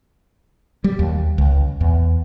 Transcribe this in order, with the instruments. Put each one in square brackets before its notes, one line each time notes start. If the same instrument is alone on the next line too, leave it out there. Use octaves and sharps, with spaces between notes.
[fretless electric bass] G3
D#2
C#2
E2